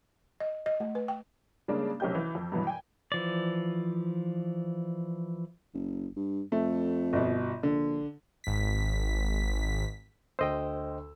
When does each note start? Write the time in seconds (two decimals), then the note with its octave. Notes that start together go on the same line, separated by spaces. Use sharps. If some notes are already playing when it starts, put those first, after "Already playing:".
0.40 D#5
0.66 D#5
0.80 A3
0.95 B4
1.08 G5
1.68 C#3 G3 G#3 A#3 C#4 D4
2.00 B1 C3 C#4 G4 D#5 G6
2.15 E3
2.35 F2
2.52 G2 B2 E3 F#3
2.67 G5 G#5
3.12 E3 F3 D5
5.74 F#1
6.16 G2
6.52 F2 A3
7.13 G1 B2
7.63 A#1 D3
8.44 G#1 B6
10.39 D2 C5 D#5 G5 E6